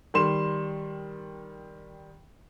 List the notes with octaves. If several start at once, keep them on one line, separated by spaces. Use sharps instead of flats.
D#3 G3 C6 E7